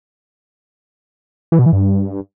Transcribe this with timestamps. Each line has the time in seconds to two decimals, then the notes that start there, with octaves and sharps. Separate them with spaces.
1.52 E3
1.59 B2
1.66 E3
1.73 G2